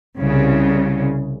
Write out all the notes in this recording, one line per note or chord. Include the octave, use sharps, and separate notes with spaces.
C2 C#3